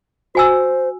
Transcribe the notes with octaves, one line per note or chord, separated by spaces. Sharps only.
F#4 C5 G#5 E6